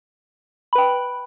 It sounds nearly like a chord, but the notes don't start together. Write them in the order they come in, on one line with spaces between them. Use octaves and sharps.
B5 B4 G5